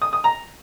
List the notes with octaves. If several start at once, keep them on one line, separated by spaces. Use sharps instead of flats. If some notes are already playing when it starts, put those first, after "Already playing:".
D#6
D#6
A#5